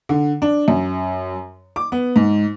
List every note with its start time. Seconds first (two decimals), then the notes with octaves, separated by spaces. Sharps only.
0.09 D3
0.42 D4
0.68 F#2
1.76 D6
1.92 B3
2.16 G#2